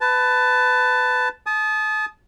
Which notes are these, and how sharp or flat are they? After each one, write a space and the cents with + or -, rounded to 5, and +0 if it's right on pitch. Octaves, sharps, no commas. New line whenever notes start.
B4 +20 A5 +0
A5 -35 D#6 +0